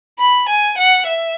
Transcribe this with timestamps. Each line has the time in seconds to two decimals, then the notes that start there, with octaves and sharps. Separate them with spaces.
0.19 B5
0.48 G#5
0.78 F#5
1.07 E5